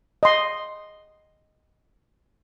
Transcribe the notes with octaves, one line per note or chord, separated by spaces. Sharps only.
D#5 C6